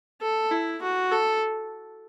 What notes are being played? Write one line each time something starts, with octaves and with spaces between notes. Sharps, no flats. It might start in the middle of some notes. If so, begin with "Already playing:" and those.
A4
E4
F#4
A4